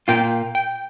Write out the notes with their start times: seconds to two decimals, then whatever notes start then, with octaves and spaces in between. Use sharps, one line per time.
0.08 A#2 A#3 F4 G5
0.55 G5